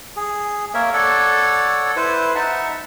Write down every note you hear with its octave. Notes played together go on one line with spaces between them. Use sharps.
G#4
A#3 A#4 C#5 E5
A4 C#5 D5 F#5
E4 B4 C5
D#4 E5 F#5 A5